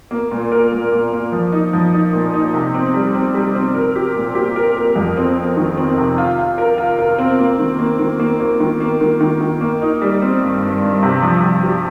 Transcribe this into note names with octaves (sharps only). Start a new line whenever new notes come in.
A#3
A#2
A#4
A#2
A#2
A#3
F3
D#4
F3
D#4
A#2
D#4
C3
C4
G3
C4
G3
C4
A#4
G4
A#2
G4
A#4
A#4
F2
C4
C4
D#3
C4
C3
F4
F4
A#4
F4
A#4
C4
A#3
D#3
A#3
D#3
A#3
A#3
D#3
A#3
D#3
D#3
D#3
A#3
D#4
G3
C4
G2
G2
G2
C3
F3
C3
G4